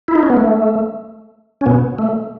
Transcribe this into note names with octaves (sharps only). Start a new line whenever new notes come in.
E4
D#4
C#4
B3
A3
C#4
B2 B3
A3